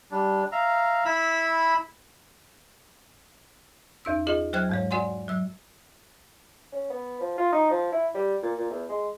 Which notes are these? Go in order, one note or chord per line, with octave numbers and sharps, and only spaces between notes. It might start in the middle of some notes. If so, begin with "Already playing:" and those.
G3 D4
E5 F5 A#5
E4 B5 E6
E2 D#4 E6
F4 G#4 D#5
F#3 C5 G5 F6 F#6 G#6
G#2 G#3 C#5
F#4 D5 F#5 G#5 C6
F#3 E6
C#4
B3
F3
F4
D#4
F3
E4
G3
A#2
A#2
E2
G#3